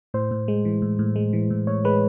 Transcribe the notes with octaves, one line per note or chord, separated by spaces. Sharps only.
A2 C5
A2
G#3
E3
A2
A2
G#3
E3
A2
A2 C#5
G#3 B4